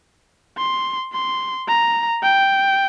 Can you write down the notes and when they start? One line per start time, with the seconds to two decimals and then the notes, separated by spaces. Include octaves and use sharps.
0.58 C6
1.13 C6
1.68 A#5
2.23 G5